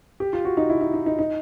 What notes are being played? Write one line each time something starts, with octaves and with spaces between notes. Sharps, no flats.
G4
F4
F#4
D#4
E4
D#4
D#4
D#4
D#4